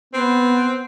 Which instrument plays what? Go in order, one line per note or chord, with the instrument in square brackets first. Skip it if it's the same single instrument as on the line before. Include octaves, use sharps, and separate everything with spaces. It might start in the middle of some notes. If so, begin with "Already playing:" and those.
[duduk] B3 [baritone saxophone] C4